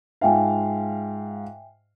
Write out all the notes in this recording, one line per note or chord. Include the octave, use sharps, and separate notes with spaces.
G#2 F4 E5 F5 G5 G#5